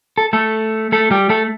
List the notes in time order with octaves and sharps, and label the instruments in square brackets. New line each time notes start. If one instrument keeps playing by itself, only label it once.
[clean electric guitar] A4
A3 A4
A3 A4
G3 G4
A3 A4